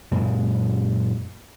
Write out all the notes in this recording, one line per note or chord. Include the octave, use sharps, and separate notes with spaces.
F#2 A#2 G#3